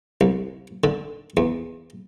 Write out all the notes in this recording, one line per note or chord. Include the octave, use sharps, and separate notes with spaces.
C2
D3
E2